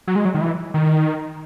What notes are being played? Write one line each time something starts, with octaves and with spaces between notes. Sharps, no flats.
F#3
G#3
F#3
D#3
E3
D#3